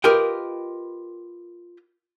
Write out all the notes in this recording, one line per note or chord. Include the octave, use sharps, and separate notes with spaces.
F4 G4 A#4 B4 D#5 G5